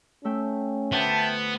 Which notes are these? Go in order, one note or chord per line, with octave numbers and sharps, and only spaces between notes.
A3 C#4 E5 G5
D2 B3 C5 E5 G5 A5 D6